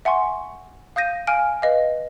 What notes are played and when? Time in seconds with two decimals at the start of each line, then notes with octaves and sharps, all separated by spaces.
0.05 E5 F#5 G#5 C6 C#6
0.96 F5 D#6 G6 A#6 D#7
1.27 F5 G#5 F6 D7
1.62 B4 D#5 F5